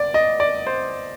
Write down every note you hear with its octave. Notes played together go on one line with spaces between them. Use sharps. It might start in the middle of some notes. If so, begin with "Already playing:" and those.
Already playing: D5
D#5
D5
C5